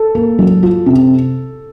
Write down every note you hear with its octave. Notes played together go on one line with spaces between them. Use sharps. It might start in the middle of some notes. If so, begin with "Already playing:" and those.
Already playing: A4
A#3
F#3
F4
C3